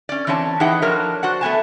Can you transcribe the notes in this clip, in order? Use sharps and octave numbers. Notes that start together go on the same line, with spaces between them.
C#4 D5
E3 C4 C#4 C#5 G5 A5
E3 D#4 G#4 B4 F#5 G5
F3 F#3 D4 A#4 C#5
F#4 C5 D5 F#5
A3 B3 G#5 A5